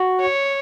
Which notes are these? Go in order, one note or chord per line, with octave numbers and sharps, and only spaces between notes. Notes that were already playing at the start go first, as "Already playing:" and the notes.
Already playing: F#4
C#5